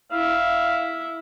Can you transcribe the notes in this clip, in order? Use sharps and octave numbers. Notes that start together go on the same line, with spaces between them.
E4 F5